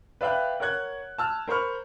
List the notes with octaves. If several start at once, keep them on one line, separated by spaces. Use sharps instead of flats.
B4 D5 E5 F5 G5 F#6
A#4 C#5 F#5 F#6 G#6
A5 E6 F6
A#4 C5 B5 C#6 F6